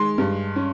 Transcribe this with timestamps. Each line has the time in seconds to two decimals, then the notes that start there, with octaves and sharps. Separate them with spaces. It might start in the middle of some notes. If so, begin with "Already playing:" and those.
Already playing: D#3 G#3 C6
0.18 G2
0.56 C#4